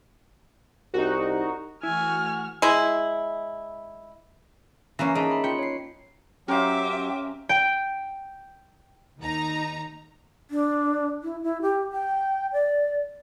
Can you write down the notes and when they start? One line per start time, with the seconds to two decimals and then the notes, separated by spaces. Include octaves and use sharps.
0.94 C2 D#4 F#4
1.83 E3 A3 E4 F#4 G#5 F6
2.62 G#3 E4
4.99 E3 A#3 C#4 A#6 C7
5.15 D#4 G#4 E5 A5
5.31 B5
5.44 F4 G5 C#7
5.59 C#5 C7
6.48 F#3 C#4 G4 A#4 C5 E5 F5 D6
7.49 G5
9.19 D#2 D#4 A#5
10.51 D4
11.23 E4
11.43 E4
11.62 G4
11.92 G5
12.53 D5